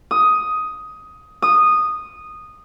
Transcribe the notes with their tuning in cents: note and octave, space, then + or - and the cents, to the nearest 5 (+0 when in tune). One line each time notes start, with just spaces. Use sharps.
D#6 +10
D#6 -10